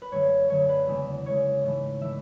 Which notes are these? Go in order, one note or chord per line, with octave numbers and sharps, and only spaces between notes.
B4
F#2 D3 F#3 A3 C#5
F#2 D3 F#3 A3 C#5
B4
E2 C#3 G#3
E2 C#3 G#3 C#5
G#2 E3 A3
E3 A3 E5